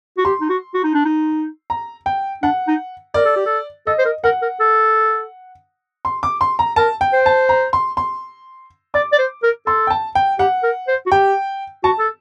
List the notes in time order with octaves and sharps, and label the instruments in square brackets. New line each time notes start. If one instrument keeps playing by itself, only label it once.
[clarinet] F#4
[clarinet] G4 [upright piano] C6
[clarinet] D#4
F#4
F#4
D#4
D4
D#4
[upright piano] A#5
G5
[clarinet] D4 [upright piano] F#5
[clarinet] D#4
[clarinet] A#4 [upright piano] D5
[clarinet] A4
G4
A4
[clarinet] A4 [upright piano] D#5
[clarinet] C5
A#4
[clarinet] A#4 [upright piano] F#5
[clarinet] A#4
A4
[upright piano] C6
D6
C6
A#5
[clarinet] A#4 [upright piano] A5
[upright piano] G5
[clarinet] C5
[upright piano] A5
A#5
C6
C6
[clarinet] D5 [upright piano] D6
[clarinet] D5
C5
A#4
[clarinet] A4 [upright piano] C6
[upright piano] G5
A5
G5
[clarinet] G4 [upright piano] F#5
[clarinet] A#4
C5
F#4
[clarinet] G4 [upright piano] G5
[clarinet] F#4 [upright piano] A5
[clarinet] A4